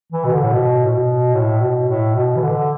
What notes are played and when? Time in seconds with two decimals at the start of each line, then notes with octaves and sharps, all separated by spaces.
0.12 E3
0.25 B2
0.33 D3
0.43 A2
0.53 B2
0.84 A2
0.93 B2
1.34 A2
1.61 B2
1.88 A2
2.15 B2
2.36 E3
2.42 D3